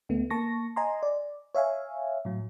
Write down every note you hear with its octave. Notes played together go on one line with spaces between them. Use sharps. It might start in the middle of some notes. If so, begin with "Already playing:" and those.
D2 A3 B3
A#3 A5 C#6 A#6
D#5 G#5 A#5 C6
D5
C#5 E5 F5 G#5
A2 F#3